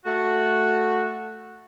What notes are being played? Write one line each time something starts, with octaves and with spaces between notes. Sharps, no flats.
A3 F#4